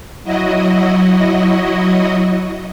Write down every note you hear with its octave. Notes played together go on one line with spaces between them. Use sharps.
F#3 E4 F#4 D#5